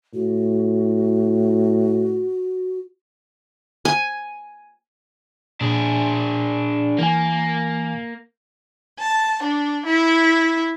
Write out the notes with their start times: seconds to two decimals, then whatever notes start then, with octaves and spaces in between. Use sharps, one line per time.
0.14 A2 F#4
3.85 G#5
5.61 A#2 D4 G#4
6.99 E3 A#3 G#5
8.98 A5
9.42 D4
9.85 E4